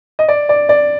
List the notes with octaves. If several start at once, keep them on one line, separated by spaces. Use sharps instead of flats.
D#5
D5
D5
D5